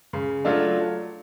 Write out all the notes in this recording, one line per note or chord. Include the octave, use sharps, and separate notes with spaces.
C#3
F#3 A3 D4 F4